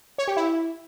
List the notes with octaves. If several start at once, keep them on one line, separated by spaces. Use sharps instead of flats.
C#5
G4
E4